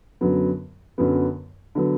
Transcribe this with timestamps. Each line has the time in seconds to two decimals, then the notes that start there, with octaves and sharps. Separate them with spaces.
0.21 F#2 D3 F#3 B3
0.98 F#2 D3 F#3 B3
1.75 D3 F#3 B3